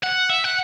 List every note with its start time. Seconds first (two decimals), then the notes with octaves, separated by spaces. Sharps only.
0.04 F#5
0.30 E5
0.44 F#5